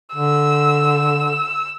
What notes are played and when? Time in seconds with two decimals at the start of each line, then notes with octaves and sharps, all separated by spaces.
0.15 D3 E6